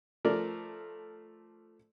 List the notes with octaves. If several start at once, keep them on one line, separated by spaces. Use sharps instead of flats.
F3 A3 A#4 D5